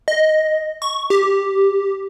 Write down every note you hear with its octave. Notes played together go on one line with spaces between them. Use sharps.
D#5
C#6
G4